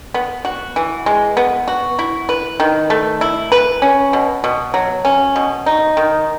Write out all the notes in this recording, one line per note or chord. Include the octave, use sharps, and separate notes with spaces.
B3
F#4
E3
G#3
B3
F#4
E4
B4
D#3
A3
E4
B4
C#4
B2
B2
F#3
C#4
B2
D#4
D#3